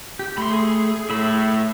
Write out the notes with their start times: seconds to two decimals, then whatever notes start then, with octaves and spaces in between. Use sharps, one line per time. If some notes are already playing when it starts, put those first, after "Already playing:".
0.19 G4
0.38 A3 B5 C6
0.51 G#4
1.10 A2 E5 B5